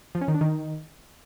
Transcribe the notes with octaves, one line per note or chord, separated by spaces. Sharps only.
F3
C#4
D#3
D4
D#3